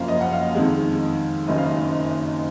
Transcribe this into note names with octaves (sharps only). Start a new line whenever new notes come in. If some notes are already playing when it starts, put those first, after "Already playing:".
Already playing: F#1 F#2 F3 A#3 F5
D#5
F#5
F5
F2 D#3 G#3
F#1 F#2 D#3 D#5
F5
D#5